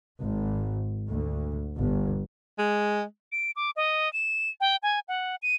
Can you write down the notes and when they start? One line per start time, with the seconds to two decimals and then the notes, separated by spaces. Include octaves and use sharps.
0.19 G#1
1.09 D2
1.77 G1
2.59 G#3
3.32 D7
3.56 D6
3.76 D#5
4.13 E7
4.61 G5
4.83 G#5
5.08 F#5
5.42 D#7